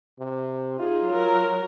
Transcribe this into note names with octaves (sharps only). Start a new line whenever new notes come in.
C3
D#4 F4 G#4
F#3 A#4